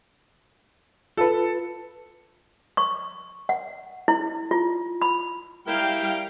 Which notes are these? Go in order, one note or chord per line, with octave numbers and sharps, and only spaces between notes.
F4 A4 B4
C#6
F#5
E4
F4
B5
G3 E4 A#4 F5 G5